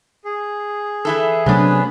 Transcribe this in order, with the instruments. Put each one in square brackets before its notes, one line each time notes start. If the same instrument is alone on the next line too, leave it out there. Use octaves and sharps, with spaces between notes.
[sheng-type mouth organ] G#4
[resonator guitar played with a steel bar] E3 E4 A4
[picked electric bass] C3 F#3 A3 [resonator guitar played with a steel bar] B3 D4 [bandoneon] C#4 B5